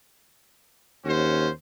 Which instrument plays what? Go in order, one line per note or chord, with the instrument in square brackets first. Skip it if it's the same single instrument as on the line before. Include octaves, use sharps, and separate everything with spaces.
[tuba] D#2 [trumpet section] C#4 F#4 C5